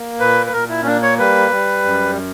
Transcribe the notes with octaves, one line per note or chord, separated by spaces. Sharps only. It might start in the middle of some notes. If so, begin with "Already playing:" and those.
Already playing: A#3
A#2 B4
B4
A#2 A#4
E4
C#4
A#3 D4
C#5
G3 B4
G3
F#2